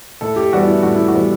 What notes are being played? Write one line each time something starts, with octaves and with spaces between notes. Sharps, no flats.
A2 A4
G4
E3 G3 B3 F#4
E4
A2 F#4
E4
F#4
E3 G3 B3